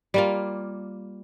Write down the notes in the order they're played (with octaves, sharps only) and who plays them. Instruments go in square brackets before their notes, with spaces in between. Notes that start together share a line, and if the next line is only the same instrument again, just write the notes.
[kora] G3 A#3 F4